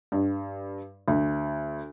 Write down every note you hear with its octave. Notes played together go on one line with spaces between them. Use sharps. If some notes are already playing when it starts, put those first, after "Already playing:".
G2
D2